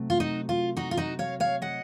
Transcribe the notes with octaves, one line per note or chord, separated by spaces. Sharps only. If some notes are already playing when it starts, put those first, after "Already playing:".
Already playing: C3 F#3 A3
F4
D#4 F#4
F4
D#4 F#4
F4
D#4 F#4
C#5 F5
C#5 F5
D#5 F#5